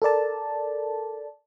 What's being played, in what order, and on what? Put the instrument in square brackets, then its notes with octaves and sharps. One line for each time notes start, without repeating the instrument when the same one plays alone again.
[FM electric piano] A4 A#4 D5 A5